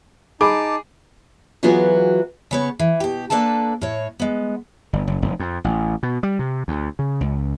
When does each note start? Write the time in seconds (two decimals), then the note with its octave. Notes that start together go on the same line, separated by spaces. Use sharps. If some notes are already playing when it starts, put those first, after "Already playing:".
0.41 D#4 G#4 G#5 A5 B5 D6
1.63 E3 F#3 B3 F4 F#4 G#4
2.51 C#3 B3 C#5
2.79 E3
3.00 B2 G4
3.30 A#3 D4 A4 B4 A5
3.81 A2 C#5
4.19 G#3 B3
4.93 G1
5.07 F#1
5.22 F1
5.40 F2
5.64 A1
6.03 B2
6.23 G3
6.39 C3
6.68 D2
6.99 C#3
7.21 C#2